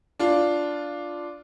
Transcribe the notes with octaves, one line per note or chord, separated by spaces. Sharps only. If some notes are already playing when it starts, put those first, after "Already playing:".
D4 F4